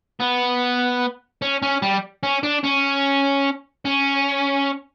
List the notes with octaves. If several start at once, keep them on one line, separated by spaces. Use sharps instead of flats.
B3
C#4
C#4
G3
C#4
D4
C#4
C#4